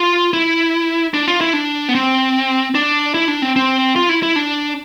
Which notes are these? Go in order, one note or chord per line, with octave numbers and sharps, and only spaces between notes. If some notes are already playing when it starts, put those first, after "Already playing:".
Already playing: F4
E4
D4
F4
E4
D4
B3
C4
D4
E4
D4
C4
C4
F4
E4
E4
D4